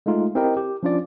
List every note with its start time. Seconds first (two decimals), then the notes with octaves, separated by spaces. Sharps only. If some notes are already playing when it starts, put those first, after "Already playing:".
0.06 G#3 A3 D#4 F4
0.35 C4 E4 G4 A#4 D#5 G5
0.57 G4
0.83 F3 C#4 D4 F4 D5